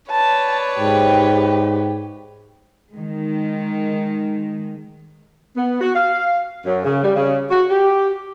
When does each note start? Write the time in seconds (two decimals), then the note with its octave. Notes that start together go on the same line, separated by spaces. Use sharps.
0.11 B4 C#5 D5 A5
0.80 G#2 G4
2.93 D#3 G#3
5.56 B3
5.81 F#4
5.95 F5
6.65 F#2
6.85 C#3
7.04 G3
7.16 C#3
7.50 F#4
7.69 G4